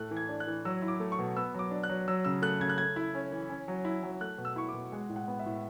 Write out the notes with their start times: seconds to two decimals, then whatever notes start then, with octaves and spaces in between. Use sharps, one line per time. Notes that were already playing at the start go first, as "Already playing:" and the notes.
Already playing: A2 A3 F#6
0.11 E3
0.17 G#6
0.29 D4
0.40 F#6
0.47 E3
0.65 F#3 E6
0.82 E4
0.88 D6
1.00 A3
1.12 C#6
1.19 B2
1.37 B3 E6
1.54 F#3 D6
1.71 D4
1.83 F#6
1.89 F#3
2.08 F#3 E6
2.25 C#3 E6
2.42 A3 F#6
2.60 C#3 G#6
2.69 F#6
2.78 A3 G#6
2.96 E4
3.15 C#4
3.31 E3
3.49 C#4
3.68 F#3
3.85 E4
4.03 F#3
4.21 A3 F#6
4.38 B2
4.45 E6
4.56 E4 C#6
4.69 D6
4.74 B2
4.92 G#3 F#5
5.09 A2
5.16 F#5
5.28 B3
5.39 E5
5.46 A2